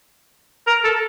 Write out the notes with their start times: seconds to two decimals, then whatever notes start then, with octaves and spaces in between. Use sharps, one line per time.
0.67 A#4
0.84 A4